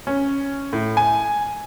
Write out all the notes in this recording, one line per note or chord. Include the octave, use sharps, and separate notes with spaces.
C#4
A2
G#5